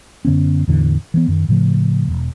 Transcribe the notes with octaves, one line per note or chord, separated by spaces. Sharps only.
F#2 D3 B3 C#4
E2 A2 D3 E3
E3 A#3 B3
F#2 D#3
A2 C#3 F3 A3
E1